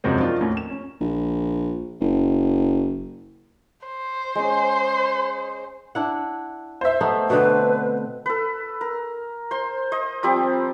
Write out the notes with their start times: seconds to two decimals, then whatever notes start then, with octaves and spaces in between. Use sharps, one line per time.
0.04 F#2 C3 F3 G#3 C4 C#4
0.19 D#3 F3 F#3 D4 D#4 F4
0.41 D#2 A2 A#3 C#4
0.57 E7
0.70 C#4
1.01 A#1
2.00 F#1
3.87 C5
4.35 G#3 C#4
5.95 D4 E4 F#5
6.81 C5 E5
7.01 A3 B3 D#4
7.30 B2 D3 C4 B4
8.26 A4 B4
8.81 A#4
9.51 C5 C6
9.92 C5 D#5
10.23 F3 G3 C4 G4